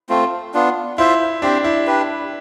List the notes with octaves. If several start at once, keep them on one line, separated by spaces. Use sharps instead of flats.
A3 C4 F4
B3 D4 F4
E4 F4 C5 E5
C4 D4 G4 C5
E4
D4 G4 B4